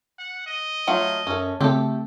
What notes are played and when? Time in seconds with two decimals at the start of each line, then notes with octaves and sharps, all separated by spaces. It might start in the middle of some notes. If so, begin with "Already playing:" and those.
0.19 F#5
0.47 D#5
0.88 F#3 A3 F4 F#5
1.27 F#2 C#4 A4
1.61 C#3 A3 C4 G4 A4